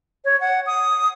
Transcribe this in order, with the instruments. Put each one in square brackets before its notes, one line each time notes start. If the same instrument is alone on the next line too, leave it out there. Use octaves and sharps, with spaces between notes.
[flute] C#5
F#5
D#6